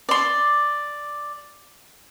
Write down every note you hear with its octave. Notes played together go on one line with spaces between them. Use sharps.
D5 C6